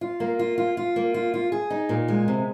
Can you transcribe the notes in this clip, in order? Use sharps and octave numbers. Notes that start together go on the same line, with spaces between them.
F4
A#3
F4
F4
F4
A#3
F4
F4
G#4
D#4
A#2
G#3
C3